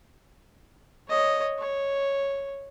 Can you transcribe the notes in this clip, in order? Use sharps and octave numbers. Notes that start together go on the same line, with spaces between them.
C#5 D#5
C#5